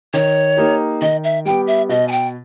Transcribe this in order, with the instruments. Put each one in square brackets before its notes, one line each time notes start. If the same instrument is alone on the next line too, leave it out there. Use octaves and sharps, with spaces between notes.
[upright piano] D#3 [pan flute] C#5
[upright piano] A#3 D#4 G4
[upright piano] D#3 [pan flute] D#5
[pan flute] E5
[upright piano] G3 B3 G4 [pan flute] G5
[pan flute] E5
[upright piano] B2 [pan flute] D#5
[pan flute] G#5
G5